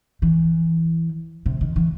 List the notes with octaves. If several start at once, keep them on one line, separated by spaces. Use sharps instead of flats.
E3
C3
D#3
E3